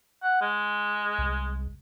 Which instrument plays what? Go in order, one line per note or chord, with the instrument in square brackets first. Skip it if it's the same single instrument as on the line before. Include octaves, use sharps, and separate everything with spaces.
[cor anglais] F#5
G#3
[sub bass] C2